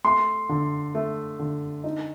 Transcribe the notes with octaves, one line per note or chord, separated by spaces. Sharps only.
A3 C6
D3
A3
D3
D#4